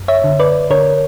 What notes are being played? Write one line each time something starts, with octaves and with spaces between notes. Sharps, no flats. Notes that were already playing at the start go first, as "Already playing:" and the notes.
Already playing: F#2
C#5 E5
D3
B4 D5
D3 A#4 C#5